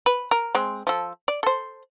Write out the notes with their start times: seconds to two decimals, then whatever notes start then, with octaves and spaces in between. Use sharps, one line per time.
0.06 B4
0.31 A#4
0.55 G#3 C4
0.87 F3 A4
1.28 D5
1.43 A4 C5